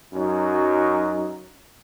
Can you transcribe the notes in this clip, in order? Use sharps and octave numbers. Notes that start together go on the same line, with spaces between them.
F#2 F#3 D#4